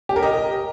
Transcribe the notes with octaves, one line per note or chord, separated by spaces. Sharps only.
G4
A#4
D#5